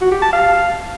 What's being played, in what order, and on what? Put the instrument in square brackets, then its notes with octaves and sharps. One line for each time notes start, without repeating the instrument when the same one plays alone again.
[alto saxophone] F#4
G4
A5
F5